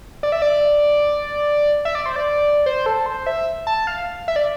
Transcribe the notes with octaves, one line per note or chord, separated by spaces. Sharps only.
D5
E5
D5
E5
D5
C5
D5
C5
A4
C5
E5
A5
F5
E5
D5